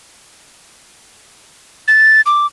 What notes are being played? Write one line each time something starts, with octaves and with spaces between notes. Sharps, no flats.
A6
D6